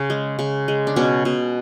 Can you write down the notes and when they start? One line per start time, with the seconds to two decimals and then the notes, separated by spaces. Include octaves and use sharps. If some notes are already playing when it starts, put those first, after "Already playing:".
Already playing: C#3
0.10 G#3
0.39 C#3
0.68 G#3
0.87 D4
0.96 B2 C#4
1.25 B2